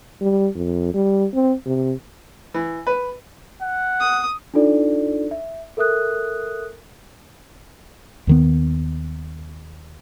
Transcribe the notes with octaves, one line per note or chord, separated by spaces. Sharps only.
G3
F2
G3
C4
C3
E3
B4
F#5
D#6
D4 D#4 F4 A4 D5
E5
A4 A#4 E5 D#6 F#6
D#2 D#3 B3